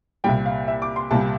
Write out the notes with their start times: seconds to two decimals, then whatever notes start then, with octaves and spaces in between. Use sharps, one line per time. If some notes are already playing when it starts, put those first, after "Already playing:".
0.24 C2 A#2 G3 G5
0.46 F5
0.68 E5
0.82 D6
0.96 C6
1.11 C2 A#2 G3 A5